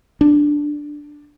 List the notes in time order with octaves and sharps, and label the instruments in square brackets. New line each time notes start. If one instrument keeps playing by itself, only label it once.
[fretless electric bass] D4